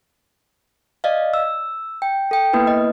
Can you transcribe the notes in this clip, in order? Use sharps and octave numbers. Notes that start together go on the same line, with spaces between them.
D5 D#5 F5
E6
G5
A4 G5
A#3 B3 E4 B4
D#5